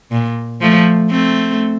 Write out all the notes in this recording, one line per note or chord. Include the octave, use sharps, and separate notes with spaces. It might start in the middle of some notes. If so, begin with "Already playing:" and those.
A#2
F3 A3
A3 C4